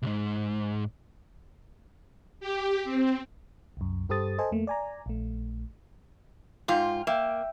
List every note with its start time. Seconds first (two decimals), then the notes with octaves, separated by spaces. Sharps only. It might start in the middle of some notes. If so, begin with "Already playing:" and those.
0.02 C2 G#2
2.40 G4
2.84 C4
3.77 C2 F#2
4.09 G2 G4 A4 C5 D#6 A6
4.38 A4 C5 D#5 G#5 A5
4.51 F2 A3 A#3
4.67 D5 G#5 A#5
5.06 A#1 A3
6.68 G#2 F4 G5
7.07 A#3 E5 G5 E7